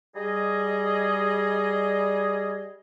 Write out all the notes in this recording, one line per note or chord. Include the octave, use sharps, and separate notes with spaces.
G3 G#4 D#5